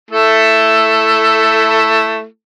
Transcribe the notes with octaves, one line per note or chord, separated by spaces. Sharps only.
A3 E4 A4